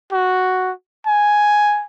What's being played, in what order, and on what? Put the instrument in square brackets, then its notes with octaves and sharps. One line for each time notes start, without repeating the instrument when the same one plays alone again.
[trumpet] F#4
G#5